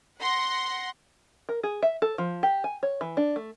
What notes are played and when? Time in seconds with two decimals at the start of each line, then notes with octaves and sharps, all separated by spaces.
0.19 F#5 C6 A#6
1.49 A#4
1.63 G#4
1.83 E5
2.02 A4
2.18 F3
2.43 G4
2.64 G#5
2.83 C#5
3.01 E3
3.17 D4
3.36 A3